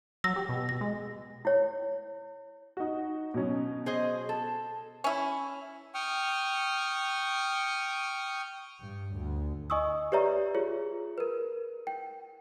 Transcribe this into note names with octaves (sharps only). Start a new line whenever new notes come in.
F#3 E6 A#6
G4
B2
A#6
G#3
E4 C#5
D#4 F#4
B2 F#3 C#4
G#4 C5 D#5
A4
C#4 E4
G5 C#6 D#6 F6
G2
D2
D#5 G#5 C#6 D#6 E6
G4 B4 C#5 D5 E5 A#5
F4 G#4 C#5
A#4 B4
G5